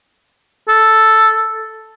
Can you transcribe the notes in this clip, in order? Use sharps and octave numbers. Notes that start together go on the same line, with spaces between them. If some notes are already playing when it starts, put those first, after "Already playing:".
A4